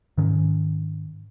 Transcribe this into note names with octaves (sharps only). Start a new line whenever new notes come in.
G#2 D#3 C#4